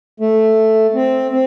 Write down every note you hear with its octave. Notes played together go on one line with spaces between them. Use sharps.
A3
C4
C4